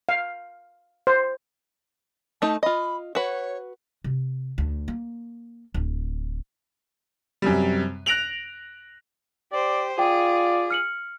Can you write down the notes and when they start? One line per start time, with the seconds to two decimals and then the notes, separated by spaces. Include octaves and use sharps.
0.09 F5
1.07 C5
2.42 A3 D#4 A5
2.63 F4 D#5 B5
3.15 F#4 B4 C#5
4.04 C3
4.58 D2
4.88 A#3
5.74 D1
7.42 F#2 C3 G3
8.06 F#6 A#6 D7 F7 F#7
9.52 G4 C5 D5
9.99 F4 G#4 D5 G5
10.71 F6 C#7 F#7